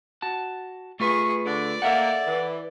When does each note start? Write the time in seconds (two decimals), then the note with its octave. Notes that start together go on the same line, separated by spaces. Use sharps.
0.22 F#4 A5
1.00 A3 F4 G#4 B4 C#6
1.46 D3 D5
1.82 A#3 A4 E5 F#5
2.27 E3